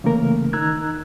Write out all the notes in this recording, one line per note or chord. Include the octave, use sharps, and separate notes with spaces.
C#3 E3 A3 A#3 A#4
D#3 D#4 A#5 E6 F#6 G#6